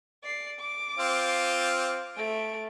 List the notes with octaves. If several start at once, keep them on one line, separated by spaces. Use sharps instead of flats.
D5 C7
D6
C4 F4
A3 D7